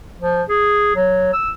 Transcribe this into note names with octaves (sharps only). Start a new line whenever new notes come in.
F3
G#4
F#3
E6